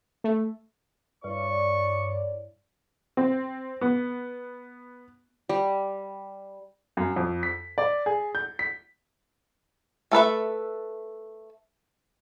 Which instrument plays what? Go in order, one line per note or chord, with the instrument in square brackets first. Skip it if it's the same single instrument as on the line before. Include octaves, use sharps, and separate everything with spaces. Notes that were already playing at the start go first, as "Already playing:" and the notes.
[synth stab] A3
[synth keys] G2 [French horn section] E4 C#5 D5 [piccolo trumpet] C#6
[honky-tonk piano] C4
B3
[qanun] G3
[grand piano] F#2
F2
B6
D5
G#4
G6
B6
[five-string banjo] A3 A4 B4 E5